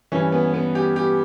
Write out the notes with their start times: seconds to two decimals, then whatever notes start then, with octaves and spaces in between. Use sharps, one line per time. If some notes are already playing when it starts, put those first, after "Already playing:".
0.12 G2 E3 C#4
0.32 B3
0.54 B3
0.75 G4
0.96 G4